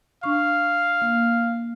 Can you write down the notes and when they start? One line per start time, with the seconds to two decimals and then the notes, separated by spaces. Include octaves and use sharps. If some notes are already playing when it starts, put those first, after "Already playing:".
0.23 D4 F5 C#6
1.02 A#3